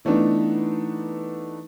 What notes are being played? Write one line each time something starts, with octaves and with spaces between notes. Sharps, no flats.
E3 A3 B3 D4 D#4